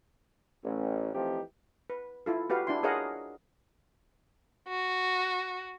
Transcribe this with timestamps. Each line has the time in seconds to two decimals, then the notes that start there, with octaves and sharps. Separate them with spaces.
0.64 A1
1.14 E3 F3 A3 C4 D#4 G4
1.90 B4
2.26 E4 F4 A4
2.50 F#4 G4 B4 F5
2.67 D4 E4 C6
2.83 G#4 A#4 C#5 D#5 F5 F#5
4.68 F#4